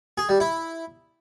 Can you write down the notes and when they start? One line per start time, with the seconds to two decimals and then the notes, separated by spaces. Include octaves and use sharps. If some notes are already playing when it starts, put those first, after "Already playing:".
0.18 G#4
0.29 G3
0.40 E4